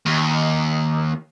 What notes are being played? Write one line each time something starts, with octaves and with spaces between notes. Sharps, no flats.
D#2